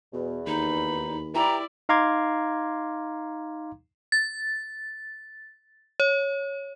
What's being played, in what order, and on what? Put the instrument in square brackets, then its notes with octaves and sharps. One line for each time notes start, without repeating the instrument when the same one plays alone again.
[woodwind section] E2 [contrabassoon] B2
[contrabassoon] D#2 [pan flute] D#4 [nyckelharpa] B5
[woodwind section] E3 G4 [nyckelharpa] E4 D5 [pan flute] A#5
[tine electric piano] D#4 F5 A#5 C6 D6 G#6
[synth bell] A6
C#5